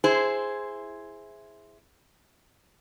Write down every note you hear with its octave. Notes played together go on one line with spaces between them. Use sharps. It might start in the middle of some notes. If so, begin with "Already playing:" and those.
E4 G#4 C5